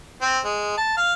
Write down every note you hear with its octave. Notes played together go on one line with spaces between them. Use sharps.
C4
G#3
A5
F5